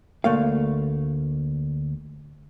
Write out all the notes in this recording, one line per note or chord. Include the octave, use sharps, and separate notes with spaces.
D2 A3 A#3 F5